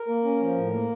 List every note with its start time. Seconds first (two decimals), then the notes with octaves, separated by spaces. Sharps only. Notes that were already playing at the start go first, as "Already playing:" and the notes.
Already playing: A#4
0.08 A#3
0.24 C#4
0.40 F3
0.57 A2
0.73 A#3